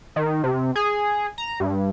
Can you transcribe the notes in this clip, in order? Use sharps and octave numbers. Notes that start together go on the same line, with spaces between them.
D#3
C3
G#4
A#5
G2